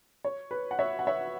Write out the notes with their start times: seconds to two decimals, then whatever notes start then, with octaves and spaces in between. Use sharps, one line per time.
0.24 C#5
0.51 B4
0.71 F#5
0.79 C#5 E5
0.99 F#5
1.07 C#5 E5